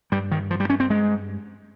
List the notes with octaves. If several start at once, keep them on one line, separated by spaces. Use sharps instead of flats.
G2 G3
D#3
F3
G3
C#4
C4
G#3